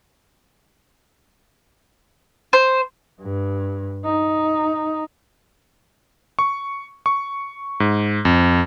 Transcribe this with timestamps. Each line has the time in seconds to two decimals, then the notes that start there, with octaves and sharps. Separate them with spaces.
2.53 C5
3.21 G2
4.04 D#4
6.39 C#6
7.06 C#6
7.80 G#2
8.25 F2